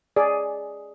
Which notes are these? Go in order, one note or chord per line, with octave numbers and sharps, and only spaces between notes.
G#4 D5